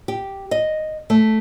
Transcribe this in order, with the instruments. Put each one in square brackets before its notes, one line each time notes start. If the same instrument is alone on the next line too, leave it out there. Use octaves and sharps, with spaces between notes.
[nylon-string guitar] G4
D#5
A3